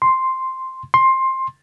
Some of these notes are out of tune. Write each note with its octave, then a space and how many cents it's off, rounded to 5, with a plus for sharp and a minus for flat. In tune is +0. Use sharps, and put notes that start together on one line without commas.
C6 +0
C6 +15